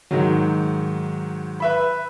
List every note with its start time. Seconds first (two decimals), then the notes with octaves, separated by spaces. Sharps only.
0.11 G#2 D#3 F#3
1.60 B4 E5 B5